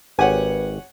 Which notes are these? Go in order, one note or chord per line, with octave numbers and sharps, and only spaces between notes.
G#1 G4 B4 C#5 F#5 G#5